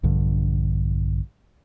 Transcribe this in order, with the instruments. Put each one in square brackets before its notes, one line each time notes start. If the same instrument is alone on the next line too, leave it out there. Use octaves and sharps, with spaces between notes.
[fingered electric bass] A#1 G2 D3